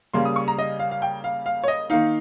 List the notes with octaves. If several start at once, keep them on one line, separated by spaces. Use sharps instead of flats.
C#3 G3 A#3 C6
D#6
C#6
A#5
D#5
F5
F5
G5
F5
F5
C#5
D#5
D#3 A#3 D#4 F5